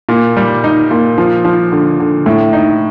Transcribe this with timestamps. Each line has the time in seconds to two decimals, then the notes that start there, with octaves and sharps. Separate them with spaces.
0.09 A#2
0.37 G3
0.64 D#4
0.91 A#2
1.18 F3
1.45 F3
1.72 D3
1.99 D3
2.26 A2
2.53 D#4